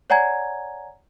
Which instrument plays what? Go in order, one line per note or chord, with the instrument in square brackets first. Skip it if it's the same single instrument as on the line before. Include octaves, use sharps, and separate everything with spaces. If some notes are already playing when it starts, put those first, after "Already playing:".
[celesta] C#5 D5 F#5 G#5 A#5 G#6